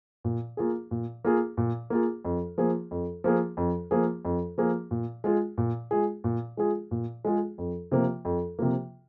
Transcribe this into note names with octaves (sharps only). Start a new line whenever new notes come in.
A#2
A#3 F4 G#4
A#2
A#3 F4 G#4
A#2
A#3 F4 G#4
F2
F3 A#3 G#4
F2
F3 A#3 G#4
F2
F3 A#3 G#4
F2
F3 A#3 G#4
A#2
G#3 F4 G#4
A#2
G#3 F4 G#4
A#2
G#3 F4 G#4
A#2
G#3 F4 G#4
F2
C3 F3 A#3
F2
C3 F3 A#3